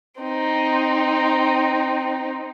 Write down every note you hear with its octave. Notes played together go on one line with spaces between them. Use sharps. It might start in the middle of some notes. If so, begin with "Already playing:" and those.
C4 D#4